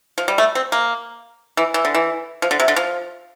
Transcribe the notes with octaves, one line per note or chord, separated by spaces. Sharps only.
F3
G3
A3
C4
A#3
E3
E3
D3
E3
F3
D3
C3
D3
F3